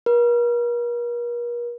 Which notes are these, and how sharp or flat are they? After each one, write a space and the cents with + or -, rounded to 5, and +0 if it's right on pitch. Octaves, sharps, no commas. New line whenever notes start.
A#4 +45